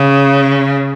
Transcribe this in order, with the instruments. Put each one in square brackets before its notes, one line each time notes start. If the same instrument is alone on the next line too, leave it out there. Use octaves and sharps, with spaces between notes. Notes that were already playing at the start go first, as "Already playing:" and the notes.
Already playing: [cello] C#3